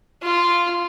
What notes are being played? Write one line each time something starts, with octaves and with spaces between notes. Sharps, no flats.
F4